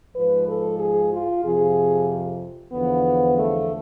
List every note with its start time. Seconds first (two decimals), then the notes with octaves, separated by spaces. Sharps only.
0.14 G#2 F3 B4
0.46 A4
0.79 G#4
1.11 F4
1.43 F2 C3 F3 G#4
2.73 E2 D3 F3 B3
3.38 A3